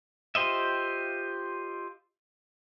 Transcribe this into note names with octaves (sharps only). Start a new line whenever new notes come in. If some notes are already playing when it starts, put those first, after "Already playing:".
F4 G4 C5 D#5 E5